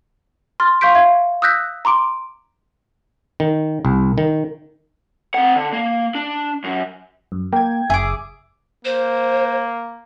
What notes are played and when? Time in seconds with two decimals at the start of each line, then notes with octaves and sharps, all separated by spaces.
0.60 C6 F6 A6
0.81 F5 C6 C#6 G6 B6 D7
0.95 E5 F5 G#6
1.42 D#6 E6 F#6 G6 A#6 B6
1.85 A#5 C6 D6 D7
3.40 D#3
3.85 C2
4.18 D#3
5.34 C4 F#5
5.56 D3
5.73 A#3
6.15 D4
6.64 F#2
7.32 F#2
7.53 A#3 G5 G#6
7.90 F#1 G#4 E5 G#5 D6
8.85 A#3 C5